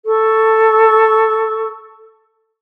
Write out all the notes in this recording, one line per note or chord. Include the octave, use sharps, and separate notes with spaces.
A4 C#6